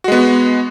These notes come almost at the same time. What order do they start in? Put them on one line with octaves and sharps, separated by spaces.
F#4 G#3 B3